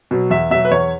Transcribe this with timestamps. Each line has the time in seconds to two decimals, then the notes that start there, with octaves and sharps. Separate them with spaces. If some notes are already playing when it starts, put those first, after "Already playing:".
0.11 B2 F#3
0.30 E2 E5
0.50 B2 F#3 E5
0.65 B4
0.71 E2 C#5